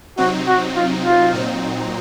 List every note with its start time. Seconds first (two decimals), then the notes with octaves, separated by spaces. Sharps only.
0.17 C3 F#3 C4 D#4 F#4
0.47 F#4
0.76 F4
1.05 F4
1.34 A#2 F#3 C4 D#4